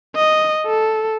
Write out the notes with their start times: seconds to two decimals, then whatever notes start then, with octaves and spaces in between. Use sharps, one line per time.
0.16 D#5
0.67 A4